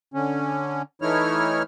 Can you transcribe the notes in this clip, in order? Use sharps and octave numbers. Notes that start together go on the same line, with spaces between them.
D3 C#4
E3 A3 D#4 E4 C#5 F6